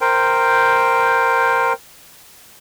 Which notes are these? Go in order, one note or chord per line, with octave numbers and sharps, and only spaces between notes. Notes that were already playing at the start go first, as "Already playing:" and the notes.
A#4 C5 G5